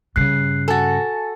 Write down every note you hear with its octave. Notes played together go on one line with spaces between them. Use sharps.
G2 C#3 F#6 C7
F#4 A4 G#5 A6